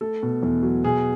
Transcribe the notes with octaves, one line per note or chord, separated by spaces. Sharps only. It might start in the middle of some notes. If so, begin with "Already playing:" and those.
A3 A4
B2
E2
F#3
B2 G#4